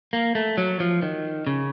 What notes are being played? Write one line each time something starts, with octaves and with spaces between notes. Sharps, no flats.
A#3
A3
F#3
F3
D#3
C#3